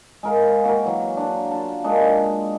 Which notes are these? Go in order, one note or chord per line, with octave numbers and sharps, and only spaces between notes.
G#3 A#4 F5
A#3 F#4 G4 A#4
E3 F#3
D4
F4 A5
G#3 A#3 D4 D#4